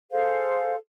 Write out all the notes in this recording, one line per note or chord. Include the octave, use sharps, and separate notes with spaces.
G#4 A4 C5 F5